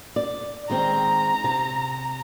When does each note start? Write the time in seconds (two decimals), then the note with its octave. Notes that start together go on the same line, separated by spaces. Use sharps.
0.16 D5
0.70 D#3 G#3 C4 A#5
1.44 C3 A5